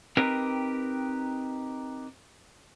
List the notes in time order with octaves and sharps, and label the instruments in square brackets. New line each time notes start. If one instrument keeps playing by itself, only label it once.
[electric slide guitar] C4 D#4 G4 A#4 B4